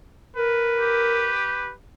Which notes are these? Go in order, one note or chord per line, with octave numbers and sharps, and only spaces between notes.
A#4 B4
G4